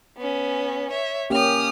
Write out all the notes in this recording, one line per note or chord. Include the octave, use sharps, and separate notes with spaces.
B3 C#4
C#5 E5
A#3 C#4 G4 D#6 F6